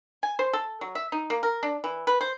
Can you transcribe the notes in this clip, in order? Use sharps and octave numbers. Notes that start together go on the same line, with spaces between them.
G#5
C5
A4
F#3
E5
D#4
A#3
A#4
D4
E3
B4
C5